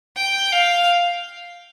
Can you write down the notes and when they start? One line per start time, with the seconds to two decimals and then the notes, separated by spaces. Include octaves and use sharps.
0.16 G5
0.53 F5